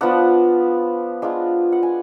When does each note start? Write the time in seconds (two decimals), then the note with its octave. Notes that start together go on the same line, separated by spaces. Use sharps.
0.01 F3 B3 D4 F#5
1.22 G#3 D4 F4
1.72 F#5
1.83 G#5